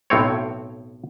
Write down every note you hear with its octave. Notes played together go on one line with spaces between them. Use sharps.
B1 A2 C4 C#5